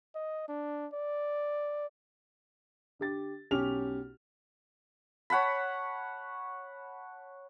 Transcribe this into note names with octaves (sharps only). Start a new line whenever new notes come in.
D#5
D4
D5
D3 G4 A6
B1 C#4 G4 F6 F7
C#5 F#5 A5 B5